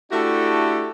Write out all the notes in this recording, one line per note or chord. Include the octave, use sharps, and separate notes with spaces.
A3 D4 E4 F#4 G4 A4